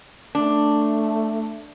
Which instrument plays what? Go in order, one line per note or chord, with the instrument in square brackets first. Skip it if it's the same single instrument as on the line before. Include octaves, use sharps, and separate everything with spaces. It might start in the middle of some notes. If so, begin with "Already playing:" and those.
[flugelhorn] A3 [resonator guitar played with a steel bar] D4